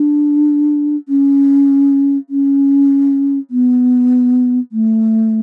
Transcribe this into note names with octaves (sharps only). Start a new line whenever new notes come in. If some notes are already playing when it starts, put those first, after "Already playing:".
Already playing: D4
C#4
C#4
B3
A3